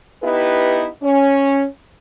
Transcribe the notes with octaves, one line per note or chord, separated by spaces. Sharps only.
B3 D#4 E4 G4 B4
C#4